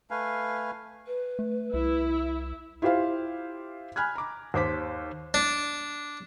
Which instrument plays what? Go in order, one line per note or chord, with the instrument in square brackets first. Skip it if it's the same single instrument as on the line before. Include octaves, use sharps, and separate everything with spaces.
[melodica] A3 B4 F5 G#5
[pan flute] B4
[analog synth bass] A3
[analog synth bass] C2 [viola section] E4
[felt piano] E4 F4 G4 C5 F5
G#5 B5 F6 F#6 G#6
A#5 D6
D#2 C5 D6 B6
[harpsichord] D4